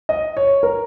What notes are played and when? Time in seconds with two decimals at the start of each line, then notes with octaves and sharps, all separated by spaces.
0.09 D#5
0.37 C#5
0.63 A#4